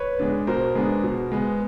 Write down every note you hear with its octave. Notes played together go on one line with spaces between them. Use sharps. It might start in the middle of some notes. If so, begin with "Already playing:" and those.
Already playing: B4 C#5
G#3 B3 D4
B2 A#4 C5
G#3 B3 D4
B2
G#3 B3